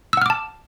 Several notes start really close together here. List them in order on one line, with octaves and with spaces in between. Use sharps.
E6 F#5 F6 D6 A5